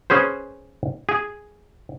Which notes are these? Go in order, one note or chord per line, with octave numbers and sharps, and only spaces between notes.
C#4 G#4 B4 C5
G#4